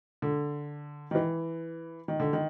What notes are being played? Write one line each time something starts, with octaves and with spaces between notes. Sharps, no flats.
D3
D#3
E3
D#3
D3
D#3